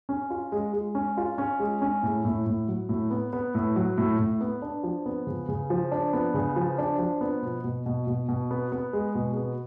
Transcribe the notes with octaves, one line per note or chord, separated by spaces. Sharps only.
C#4
F4
G#3
G#3
C#4
F4
C#4
G#3
C#4
A2
A2
A2
F#3
A2
B3
B3
A2
F#3
A2
A2
B3
D4
F3
B3
C#3
C#3
F3
D4
B3
C#3
F3
D4
F3
B3
B2
B2
B2
B2
B2
B3
B3
G#3
B2
B3